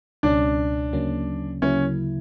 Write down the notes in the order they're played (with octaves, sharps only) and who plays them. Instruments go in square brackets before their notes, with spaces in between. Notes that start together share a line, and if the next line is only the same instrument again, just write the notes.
[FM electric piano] C#2 B2 G3 C#4 [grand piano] D4
[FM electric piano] D2 C#3 F#3 A#3 C#4
[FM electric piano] D2 C#3 F#3 A#3 E4 [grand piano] C#4